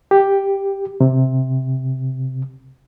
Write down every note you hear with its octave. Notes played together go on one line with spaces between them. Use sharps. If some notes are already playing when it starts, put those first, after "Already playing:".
G4
C3